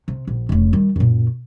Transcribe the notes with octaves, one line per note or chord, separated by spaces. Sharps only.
C3
A#1
F1 C#3
D#3 G3
F#2 A#2